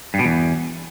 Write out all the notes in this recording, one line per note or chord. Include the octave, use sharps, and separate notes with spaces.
G2
B2
E2